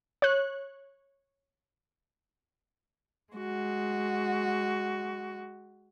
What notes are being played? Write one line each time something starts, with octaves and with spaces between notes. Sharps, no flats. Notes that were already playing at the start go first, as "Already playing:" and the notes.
C#5 F#6
G#3 F#4